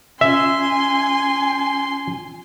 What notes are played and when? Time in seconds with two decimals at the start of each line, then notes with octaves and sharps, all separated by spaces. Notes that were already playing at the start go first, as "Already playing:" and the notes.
0.21 C#4 F4 E5 G#5 C6